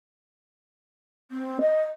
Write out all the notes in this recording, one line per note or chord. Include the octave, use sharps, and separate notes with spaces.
C4
D#5